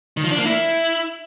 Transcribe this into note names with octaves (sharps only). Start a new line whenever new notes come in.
D#3
F3
D4
A#3
E4